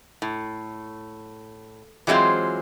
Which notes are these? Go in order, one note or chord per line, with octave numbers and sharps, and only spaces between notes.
A2
E3 F#3 G#3 C4 F4 C5